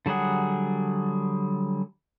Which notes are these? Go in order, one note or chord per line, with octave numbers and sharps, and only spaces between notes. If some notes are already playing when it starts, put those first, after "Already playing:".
D3 F#3 G3 G#4 F#5